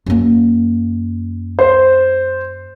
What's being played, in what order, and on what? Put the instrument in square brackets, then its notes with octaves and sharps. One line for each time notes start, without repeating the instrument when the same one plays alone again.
[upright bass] F#2 A#3
[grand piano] C5